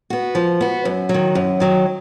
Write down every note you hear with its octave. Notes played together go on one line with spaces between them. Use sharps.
B3 F#4
F3
B3 F#4
F#2
F#3
D#3
F#2
D#3 F#3